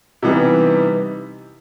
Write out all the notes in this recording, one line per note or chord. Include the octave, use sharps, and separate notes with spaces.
C3 E3 G3 B3 D#4